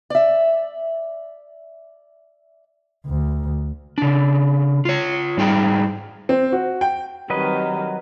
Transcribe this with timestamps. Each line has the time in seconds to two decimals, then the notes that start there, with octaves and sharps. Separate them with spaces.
0.10 D5 E5
3.06 D2
3.98 C#3 D4
4.85 F4 C#5
5.37 G#2 G3 D#4 G#4 G5
6.29 C4
6.52 F#4
6.81 G5
7.30 D#3 F#3 G3 C4 B4 D#5